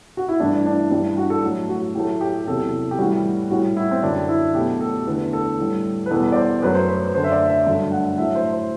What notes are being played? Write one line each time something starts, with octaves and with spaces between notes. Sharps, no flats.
F#4
E4
G2 E3 A3 D4
D4
G2 E3 G3 D4
F#4
A4
A2 F#3 A3
F#4
A2 F#3 A3 G4
G4
E2 C3 F#3 A4
G4
A2 E3 G3 F#4
A2 G3 F#4
E4
C4
F#2 D3 F#3 D4
E4
B2 F#3 A3 G4
A4
E2 D3 A3 B4
A4
A2 G3
B4
E2 B2 G3 A4
D5
C5
F#2 F#3 A3 B4
C5
B4
F#2 D3 A3 C5
E5
D5
E5
G2 D3 F#3 A3
F#5
A2 F#3 A3 E5
C5
C5